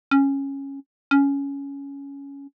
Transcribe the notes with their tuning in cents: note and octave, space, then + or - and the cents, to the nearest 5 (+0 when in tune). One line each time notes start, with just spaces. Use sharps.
C#4 -10
C#4 +10